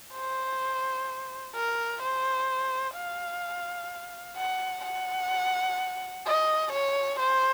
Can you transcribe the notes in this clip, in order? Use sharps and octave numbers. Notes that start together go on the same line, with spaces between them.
C5
A#4
C5
F5
F#5
F#5
D#5
C#5
C5